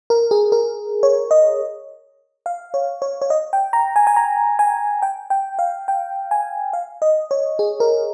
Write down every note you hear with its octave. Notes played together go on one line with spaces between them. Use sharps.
A#4
G#4
A#4
C#5
D#5
F5
C#5
C#5
C#5
D#5
G5
A#5
G#5
G#5
A#5
G#5
G5
G5
F5
G5
G#5
F5
D#5
C#5
G#4
A#4